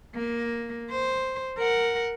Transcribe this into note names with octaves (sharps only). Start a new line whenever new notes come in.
A#3
C5
A#4 F#5